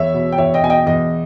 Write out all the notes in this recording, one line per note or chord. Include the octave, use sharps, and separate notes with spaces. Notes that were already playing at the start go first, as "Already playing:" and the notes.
Already playing: E2 C#5 E5
B2
G5
E2 C#5 E5
D#5 G5
B2 G#5
D#5 G5
E2 D#5